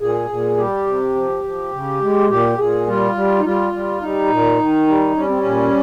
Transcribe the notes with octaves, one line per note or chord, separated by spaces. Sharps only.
A#2 G#4
A#2
G3 G4
C3
F3
F3
C#3
G#3
A#2 G4
A#2 G#4
G3 F4
G3
D#4
G3 F4
G3
G3 D#4
A#2
D#3
G3
G3 C#4
C4
C#4
A#2